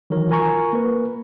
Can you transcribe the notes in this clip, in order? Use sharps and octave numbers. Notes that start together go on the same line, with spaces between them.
D#3 E3 F#3 A#4 C#5
F4 A#4 G#5 A#5 C#6
A#3 A#4 B4